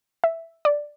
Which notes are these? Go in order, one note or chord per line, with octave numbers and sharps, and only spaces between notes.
E5
D5